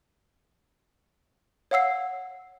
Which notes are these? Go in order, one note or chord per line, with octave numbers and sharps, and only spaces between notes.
C#5 F5 F#5 E6 C7